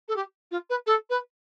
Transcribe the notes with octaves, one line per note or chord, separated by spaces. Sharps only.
A4
G4
F4
B4
A4
B4